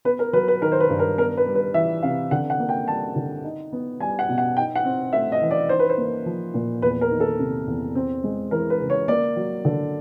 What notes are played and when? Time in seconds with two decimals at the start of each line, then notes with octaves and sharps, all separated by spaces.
0.05 B3 B4
0.19 A#4
0.33 F#3 B4
0.48 B4
0.62 D#3 A#4
0.72 C5
0.80 B4
0.90 G2
0.99 A#4
1.18 B3 A#4
1.37 B4
1.46 G3
1.55 B4
1.74 E3 E5
2.03 C3 F5
2.31 D3 F#5
2.50 F#5
2.59 A#3
2.69 G5
2.87 G3 A5
3.16 D3
3.44 D#4
3.73 B3
4.00 G3 G#5
4.19 F#5
4.29 B2
4.38 F#5
4.57 D#4 G5
4.75 F#5
4.85 C4
5.13 A3 E5
5.32 D#5
5.42 E3
5.51 D5
5.69 D#4 C5
5.79 B4
5.90 C5
5.98 A#3
6.26 F3
6.54 A#2
6.82 E2 B4
7.01 A#4
7.11 D#3
7.20 A4
7.39 C3
7.67 E2
7.95 C4
8.24 G#3
8.51 E3 A#4
8.70 B4
8.80 C#3
8.90 C#5
9.08 A#3 D5
9.36 F#3
9.65 D3